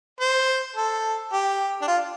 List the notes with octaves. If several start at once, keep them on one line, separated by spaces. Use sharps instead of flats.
C5
A4
G4
D4
F4